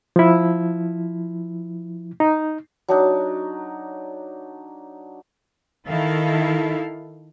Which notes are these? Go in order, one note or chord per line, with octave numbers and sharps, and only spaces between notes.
F3 E4
D#4
F#3 D4 D#4
D#3 D#4 E4 A4 F5